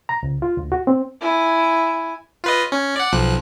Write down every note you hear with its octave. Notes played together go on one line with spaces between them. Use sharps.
A#5
C#2
F4
D2
F#4
C4
E4 G#5
F4 B4 D#5
C#4
D5 F#5
B1 F3 F#6